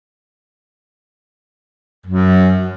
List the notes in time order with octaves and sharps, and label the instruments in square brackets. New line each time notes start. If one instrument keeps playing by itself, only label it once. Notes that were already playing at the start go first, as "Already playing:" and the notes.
[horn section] F#2